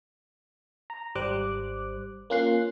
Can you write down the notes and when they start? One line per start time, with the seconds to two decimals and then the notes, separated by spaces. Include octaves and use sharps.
0.90 A#5
1.15 G#1 G3 C5 D6 F#6
2.30 A#3 C#4 F4 F#6 C7